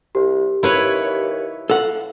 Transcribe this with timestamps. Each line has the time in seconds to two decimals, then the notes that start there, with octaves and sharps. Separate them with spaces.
0.15 C2 G4
0.63 D#2 E4 B4 C#5
1.70 A4 F5 F#5